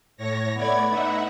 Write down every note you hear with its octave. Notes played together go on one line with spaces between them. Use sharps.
A2 C#5 A#6
A3 B3 B4 D5 F#5 G#6
D#4 B4 D#5 E5 F#5